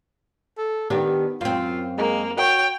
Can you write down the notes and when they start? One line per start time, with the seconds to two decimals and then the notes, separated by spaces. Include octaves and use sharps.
0.58 A4
0.90 D#3 B3 D4 G4
1.41 F#2 C4 F4
1.98 G#3 A#3
2.37 F#4 C#5 G5